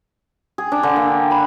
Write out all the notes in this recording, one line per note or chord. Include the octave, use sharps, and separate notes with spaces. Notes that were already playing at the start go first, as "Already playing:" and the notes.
G#4
D4
D3
A#3
G5
B5